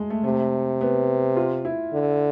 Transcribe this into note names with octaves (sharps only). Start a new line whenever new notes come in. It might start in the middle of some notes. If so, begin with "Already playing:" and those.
Already playing: G#3 A3
A3
C3 A3
B3
F4
E4
D3